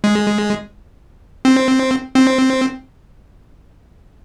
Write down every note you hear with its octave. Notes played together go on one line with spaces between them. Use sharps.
G#3
C4
C4